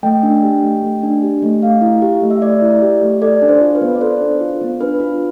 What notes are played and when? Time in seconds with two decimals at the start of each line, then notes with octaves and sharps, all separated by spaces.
0.03 A3 G5
0.23 D4
0.43 G4
0.63 A3
0.83 A3
1.03 D4
1.23 G4
1.42 A3
1.62 A3 F5
1.82 E4
2.02 G4
2.22 A3
2.30 E5
2.42 A3 D5
2.62 E4
2.82 G4
3.01 A3
3.21 A4 D5
3.42 D4
3.48 C5
3.61 F4
3.75 B4
3.81 B3
3.95 D5
4.01 A4 C5
4.21 D4
4.41 F4
4.61 B3
4.81 D4 B4
5.00 F4